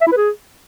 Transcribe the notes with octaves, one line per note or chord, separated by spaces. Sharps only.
E5
E4
B4
G#4